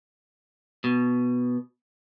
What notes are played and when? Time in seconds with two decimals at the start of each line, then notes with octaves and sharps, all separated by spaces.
0.84 B2